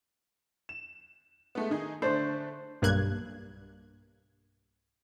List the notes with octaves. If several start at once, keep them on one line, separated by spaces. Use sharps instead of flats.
E7
G#3 A3 B3
D#3 D#4 G#4
D3 A3 D4 C5
B1 G2 A#3 F#6 G#6